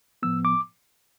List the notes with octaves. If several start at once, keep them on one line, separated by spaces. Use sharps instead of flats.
A2 F3 B3 E6
D6